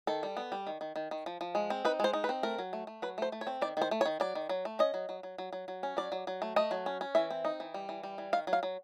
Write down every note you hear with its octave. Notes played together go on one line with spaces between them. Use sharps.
D#3 A4
G3
B3
G3
D#3
D#3
D#3
D#3
F3
F3
G#3
C4
D#4 B4
G#3 C5
D#4
B4
C4
A3 A#4
F#3
A3
A3
F#3 B4
A3 C5
A3
C#5
C4
D#3 D5
D#3 C5
A3
C#5
D#3
F#3 D5
D#3
F#3
A3
C#4 D#5
F#3
F#3
F#3
F#3
F#3
F#3
C#4
F#3 D5
F#3
F#3
A3
A3 D#5
F#3
C#4
C#4
E3 E5
C4
D#4
E3
G3
E3
G3
E3
D#3 F5
F#3
F5
F#3